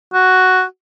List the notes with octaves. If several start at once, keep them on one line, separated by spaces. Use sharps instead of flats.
F#4